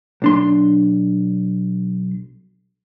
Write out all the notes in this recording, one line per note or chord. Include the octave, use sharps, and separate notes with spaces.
B1 D4 C6